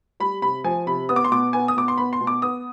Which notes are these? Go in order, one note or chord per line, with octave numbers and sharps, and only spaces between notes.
G3 B5
C3 B5
F3 G#5
C3 B5
B3 D#6
D6
C6
B2 D6
B3 G#5
D#6
B2 D6
C6
B3 B5
C6
B2
D6
B3 D#6